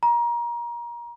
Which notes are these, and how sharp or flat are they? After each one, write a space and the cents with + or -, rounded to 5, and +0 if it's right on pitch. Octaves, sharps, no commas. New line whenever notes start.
A#5 +25